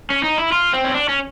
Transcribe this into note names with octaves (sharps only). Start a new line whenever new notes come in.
C#4
D#4
E4
F4
C4
C#4
D4
C#4